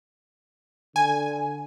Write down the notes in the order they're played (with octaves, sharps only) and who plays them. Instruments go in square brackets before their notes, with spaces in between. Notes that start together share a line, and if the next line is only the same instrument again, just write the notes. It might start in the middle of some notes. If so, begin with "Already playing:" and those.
[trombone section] D3 [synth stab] G#5